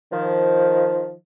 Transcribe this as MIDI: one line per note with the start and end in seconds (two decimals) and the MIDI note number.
0.12 1.11 51
0.12 1.11 53